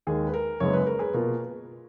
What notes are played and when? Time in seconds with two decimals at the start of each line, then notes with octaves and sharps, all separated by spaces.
0.07 D#2 D#3 G#3 G#4
0.27 B4
0.34 A#4
0.60 F#1 F#2 C#3 G#3 B3 C#5
0.73 B4
0.86 A#4
0.99 G#4 B4
1.14 B2 A#3 F4 A#4